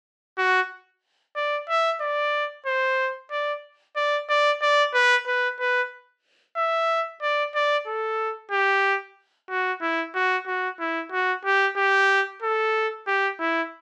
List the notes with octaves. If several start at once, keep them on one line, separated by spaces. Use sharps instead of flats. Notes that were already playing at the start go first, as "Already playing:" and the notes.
F#4
D5
E5
D5
C5
D5
D5
D5
D5
B4
B4
B4
E5
D5
D5
A4
G4
F#4
E4
F#4
F#4
E4
F#4
G4
G4
A4
G4
E4